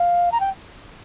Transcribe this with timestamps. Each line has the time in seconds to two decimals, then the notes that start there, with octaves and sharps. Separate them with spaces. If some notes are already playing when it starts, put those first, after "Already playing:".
Already playing: F5
0.32 A#5
0.40 G5